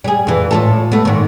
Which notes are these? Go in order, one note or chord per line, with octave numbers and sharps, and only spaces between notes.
G3 G#4
F2 E3
A2 F4 A4
A3 B3
G#2 D#3